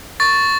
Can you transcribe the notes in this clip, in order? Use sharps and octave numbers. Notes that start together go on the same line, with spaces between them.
C#6 A6